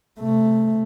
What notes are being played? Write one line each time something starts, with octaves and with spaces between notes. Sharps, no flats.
C3 A3